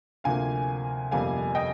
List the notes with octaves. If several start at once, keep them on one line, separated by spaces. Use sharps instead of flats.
D2 C3 F3 A#3 F5 G#5
G1 F2 C3 G3 A#3 F5 G#5
D#5 G5